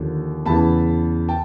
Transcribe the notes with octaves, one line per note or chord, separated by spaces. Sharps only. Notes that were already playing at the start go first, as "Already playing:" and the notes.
Already playing: D#2 D3 F3
E2 C#3 E3 A5 B5
G5 A5